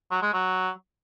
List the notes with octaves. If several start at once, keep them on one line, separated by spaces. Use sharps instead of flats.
F#3
G#3
F#3